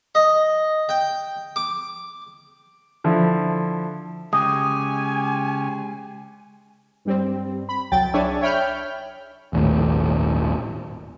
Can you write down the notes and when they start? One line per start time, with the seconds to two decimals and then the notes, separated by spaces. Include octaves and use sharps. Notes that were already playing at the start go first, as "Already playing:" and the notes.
0.15 D#5
0.89 G5
1.56 D6
3.04 D3 F3 E4
4.33 C#3 G#3 G4 G#5 D#6
7.05 G2 G3 C4
7.69 B5
7.92 C2 F#3 G5 A6
8.13 D4 G#4 C#5 D5 E5 G#5
8.41 C#5 E5 G5 B5 F6 G6
9.53 D#1 G#1 D#2 A2